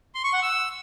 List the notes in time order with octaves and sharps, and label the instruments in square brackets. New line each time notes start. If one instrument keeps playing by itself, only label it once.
[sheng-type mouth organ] C6
C#6
F#5
E6